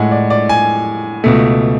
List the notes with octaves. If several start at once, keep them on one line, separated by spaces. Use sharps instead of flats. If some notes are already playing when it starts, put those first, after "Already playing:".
Already playing: A2 G#3 F#5 G#5
D5
D5
G#5
C#2 B2 A3